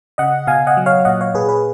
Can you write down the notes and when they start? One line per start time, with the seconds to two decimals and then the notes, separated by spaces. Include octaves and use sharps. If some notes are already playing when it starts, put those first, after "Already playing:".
0.18 C#3 D#5 F#5
0.47 B2 F5 G#5
0.67 D#5 F#5
0.77 F#3
0.86 C#5 F5
1.05 A#2 D#5 F#5
1.21 C#5 F5
1.34 A#2 G#4 B4
1.49 G#4 B4